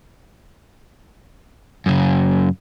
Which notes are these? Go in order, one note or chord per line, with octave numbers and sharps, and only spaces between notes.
F#2 C#3